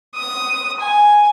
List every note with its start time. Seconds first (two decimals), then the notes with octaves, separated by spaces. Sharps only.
0.15 D#6
0.80 G#5